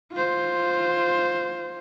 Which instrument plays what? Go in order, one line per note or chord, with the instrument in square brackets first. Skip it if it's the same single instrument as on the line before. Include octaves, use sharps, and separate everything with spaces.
[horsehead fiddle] F4 C5